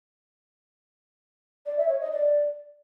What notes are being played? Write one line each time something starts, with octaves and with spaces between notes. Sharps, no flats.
D5
E5
C#5
D#5
D5